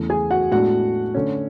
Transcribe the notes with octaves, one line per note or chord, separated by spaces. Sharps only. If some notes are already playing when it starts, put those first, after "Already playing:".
Already playing: E2 C#3 E3 A3
G#4 G#5
F#4 F#5
A2 G#3 B3 D4 F#4 F#5
D3 A3 C#4